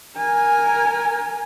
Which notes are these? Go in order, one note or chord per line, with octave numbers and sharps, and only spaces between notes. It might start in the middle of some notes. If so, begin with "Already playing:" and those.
A#4 G#5